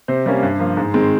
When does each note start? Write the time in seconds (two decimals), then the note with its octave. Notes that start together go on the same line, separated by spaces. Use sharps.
0.08 C3 C5
0.26 G3 A#3 C#4
0.42 G2
0.59 F3 A#3
0.77 G#2
0.94 D#3 G#3 C4